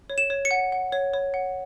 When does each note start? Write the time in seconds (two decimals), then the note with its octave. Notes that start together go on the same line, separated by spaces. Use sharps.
0.10 C#5
0.18 E7
0.30 C#5
0.45 C#7
0.51 F#5
0.72 F#5
0.92 C#5
1.14 C#5
1.34 F#5